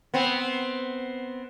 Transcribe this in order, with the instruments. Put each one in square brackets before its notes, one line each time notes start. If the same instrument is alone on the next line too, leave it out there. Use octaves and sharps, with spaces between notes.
[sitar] B3 C4